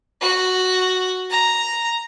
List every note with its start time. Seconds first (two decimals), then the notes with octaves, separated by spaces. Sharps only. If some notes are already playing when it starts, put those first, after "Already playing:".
0.21 F#4
1.31 A#5